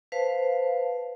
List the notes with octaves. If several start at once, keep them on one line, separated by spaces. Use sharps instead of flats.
B4 C5 F5 A5